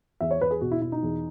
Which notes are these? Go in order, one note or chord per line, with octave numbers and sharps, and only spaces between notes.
E2 E5
C#5
E2 B4
G#4
B2 F#4
E4
B2 E4
D#4
E2